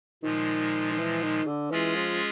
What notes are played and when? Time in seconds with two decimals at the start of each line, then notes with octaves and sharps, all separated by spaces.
0.23 A#2 D#3 F3 G#3
0.91 D#3
0.98 E3
1.22 D#3
1.47 D3
1.71 E3 G#3 C#4 F4 G#4
1.95 F3